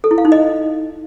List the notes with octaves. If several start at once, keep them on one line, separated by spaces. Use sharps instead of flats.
A4
E4
F5
D#4
D#5